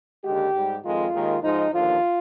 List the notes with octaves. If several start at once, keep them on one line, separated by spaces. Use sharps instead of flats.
D#2 D3 G#3 G4
G#2 G3
F2 D#3 G#3 F4
D#2 D#3 G#3
G#2 F3 G#3 D#4
D#2 D3 F3 F4